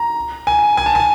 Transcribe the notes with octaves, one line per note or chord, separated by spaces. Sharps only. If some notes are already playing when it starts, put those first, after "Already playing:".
Already playing: A#5
G#5
G#5
A5
G#5